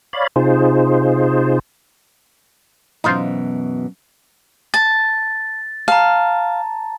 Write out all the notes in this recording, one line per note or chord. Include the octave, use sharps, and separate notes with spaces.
C#5 D5 F5 B5
C3 D#4 F4 G#4 C5
F#2 B2 E3 D#4 F4 C5
A5 A6
F5 A5 A#5